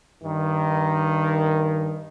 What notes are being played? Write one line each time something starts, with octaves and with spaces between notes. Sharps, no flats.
G2 D#3